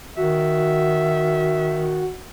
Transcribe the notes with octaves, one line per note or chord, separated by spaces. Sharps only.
D#3 F#4 E5